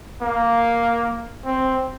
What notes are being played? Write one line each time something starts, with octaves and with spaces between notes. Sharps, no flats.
A#3
C4